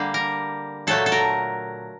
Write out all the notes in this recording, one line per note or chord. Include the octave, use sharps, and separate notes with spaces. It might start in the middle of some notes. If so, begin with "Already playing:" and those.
Already playing: D3 G3 A#3
A#4
A#2 F#3 A3 A4
A4
A#4